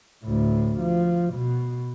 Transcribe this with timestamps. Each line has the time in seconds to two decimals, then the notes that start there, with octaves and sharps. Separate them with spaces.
0.25 D2 A2
0.81 F3
1.34 B2